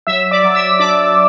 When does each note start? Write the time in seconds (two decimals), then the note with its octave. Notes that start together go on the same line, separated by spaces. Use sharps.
0.07 F#3 E5 E6
0.31 D5 D6
0.44 F#3
0.55 E5 E6
0.79 D4 D5 D6